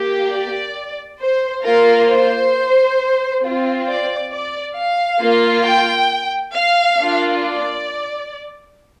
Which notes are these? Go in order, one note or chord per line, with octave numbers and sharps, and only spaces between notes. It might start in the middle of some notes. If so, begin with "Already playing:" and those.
Already playing: A#3 G4
D5
C5
A#3 F4 A#4
C5
C4 F4
D5
D5
F5
A#3 F4
G5
F5
A#3 D4 F4
D5